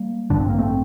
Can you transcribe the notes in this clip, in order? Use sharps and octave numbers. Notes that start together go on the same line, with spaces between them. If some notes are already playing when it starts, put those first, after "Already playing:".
Already playing: G3 A#3
A1 G2 D3 D4
C4
A#3
A3 C4